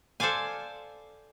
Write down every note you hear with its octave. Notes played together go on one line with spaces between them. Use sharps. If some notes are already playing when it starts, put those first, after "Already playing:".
A4 C5 D5 F5 G#5